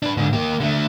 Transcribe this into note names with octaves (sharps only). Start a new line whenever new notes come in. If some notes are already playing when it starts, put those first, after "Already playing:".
D4 B4
G#2 D3
A#3 G4
D3 A3